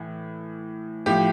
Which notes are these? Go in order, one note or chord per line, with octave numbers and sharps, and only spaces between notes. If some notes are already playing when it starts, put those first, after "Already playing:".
Already playing: A2 E3
A2 F3 G4